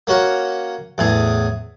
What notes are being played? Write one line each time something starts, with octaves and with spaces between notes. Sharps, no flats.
A#3 C#4 F#4 A#4
E2 A2 G#4